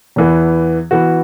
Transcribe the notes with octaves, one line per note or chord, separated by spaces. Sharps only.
E2 E3 B3
E3 B3 F#4